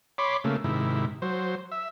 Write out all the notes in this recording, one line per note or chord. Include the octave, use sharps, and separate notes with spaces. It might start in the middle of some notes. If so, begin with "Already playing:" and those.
C#5 B5 C6 D6
C#3 A3 A#3
G#2 C3 D#3 E4
F#3 C5
E5